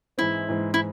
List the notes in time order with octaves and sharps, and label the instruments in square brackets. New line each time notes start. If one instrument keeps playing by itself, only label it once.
[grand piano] G#2 E3 G#3 C4 [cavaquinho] E4
[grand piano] G#2 E3 G#3 C4
[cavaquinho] E4